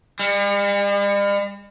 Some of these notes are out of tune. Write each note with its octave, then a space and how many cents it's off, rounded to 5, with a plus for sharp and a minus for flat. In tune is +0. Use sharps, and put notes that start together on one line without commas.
G3 +45